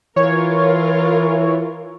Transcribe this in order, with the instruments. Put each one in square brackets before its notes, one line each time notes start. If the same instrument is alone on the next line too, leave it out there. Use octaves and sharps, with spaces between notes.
[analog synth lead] E3 [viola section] F4 A#4 [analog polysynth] C#5